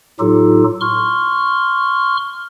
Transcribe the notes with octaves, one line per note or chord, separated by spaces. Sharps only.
A2 F#3 D#4 F4 G4 A4
C6 C#6 F6